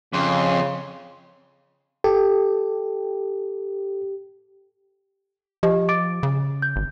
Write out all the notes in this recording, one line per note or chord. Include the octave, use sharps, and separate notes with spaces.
F2 C#3 C6
G4 A4
F3 G4 D#5
D6 A6 D7
C#3
G6
G#1